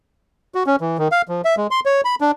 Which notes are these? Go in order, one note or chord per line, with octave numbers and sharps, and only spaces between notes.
F#4
C#4
E3
D#3
F5
F3
E5
G#3
C6
C#5
B5
D4